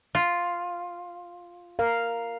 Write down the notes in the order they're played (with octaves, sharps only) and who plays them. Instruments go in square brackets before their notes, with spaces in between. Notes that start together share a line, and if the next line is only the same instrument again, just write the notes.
[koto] F4
[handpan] A#4 F5